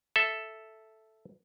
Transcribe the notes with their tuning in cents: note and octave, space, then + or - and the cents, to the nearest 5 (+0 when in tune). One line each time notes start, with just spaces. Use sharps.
A4 +0 E5 +0